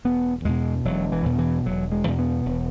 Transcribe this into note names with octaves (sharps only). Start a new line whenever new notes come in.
E1 B3
E2 B2 G#3
E1 F#3
E3
E2 B2
E3
E1 F#3
G#3
E2 B2
B3
E1